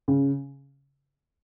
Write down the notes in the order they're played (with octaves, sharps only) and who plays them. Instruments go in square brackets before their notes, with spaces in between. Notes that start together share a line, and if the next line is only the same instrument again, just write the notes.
[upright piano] C#3